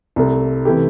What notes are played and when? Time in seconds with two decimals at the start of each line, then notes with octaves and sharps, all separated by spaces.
0.16 C2 C3 A3
0.65 C3 E3 A3 E4 G4